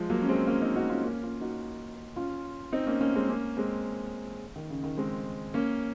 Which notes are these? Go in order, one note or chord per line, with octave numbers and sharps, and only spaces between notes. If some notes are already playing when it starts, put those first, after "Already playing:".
Already playing: F3 G#3
F#3 A#3
C#4
G#3 C4
A#3 C#4
C4 D#4
D#4 F#4
C#4 F4
A#3 C#4
C#4 F4
D#4 F#4
C#4 F4
C4 D#4
A#3 C#4
A#3 C#4
G#3 C4
A#3 C#4
G#3 C4
D#3
C#3
D#3
G#3 C4
A#3 C#4